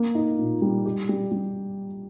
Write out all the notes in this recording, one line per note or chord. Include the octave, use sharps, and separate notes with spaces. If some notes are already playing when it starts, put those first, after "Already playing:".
Already playing: A#3
D#4
A#2
G3
G4
G3
G3